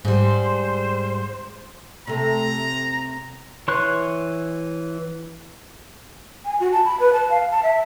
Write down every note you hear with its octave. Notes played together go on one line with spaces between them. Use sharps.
G#2 G3 C5
C3 A3 A#5
E3 C#5 C6 C#6 F#6
G#5
F#4
A5
B5
B4
A5
F5
A5
E5